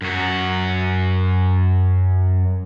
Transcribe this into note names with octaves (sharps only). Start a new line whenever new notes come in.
F#2 F#4